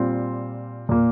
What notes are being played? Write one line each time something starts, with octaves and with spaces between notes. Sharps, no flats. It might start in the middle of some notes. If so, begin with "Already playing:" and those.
Already playing: A#2 G3 C4 F4
A#2 A#3